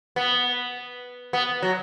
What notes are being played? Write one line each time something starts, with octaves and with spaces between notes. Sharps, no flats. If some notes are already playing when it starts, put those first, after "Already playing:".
B3
B3
F#3